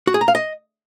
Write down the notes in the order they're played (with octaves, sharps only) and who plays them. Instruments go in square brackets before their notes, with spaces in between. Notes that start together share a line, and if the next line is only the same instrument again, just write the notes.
[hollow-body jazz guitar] F#4
G#4
A#5
F5
D#5